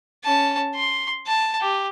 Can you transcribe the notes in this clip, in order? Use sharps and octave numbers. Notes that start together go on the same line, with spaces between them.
C#4 A5
C6
A5
G4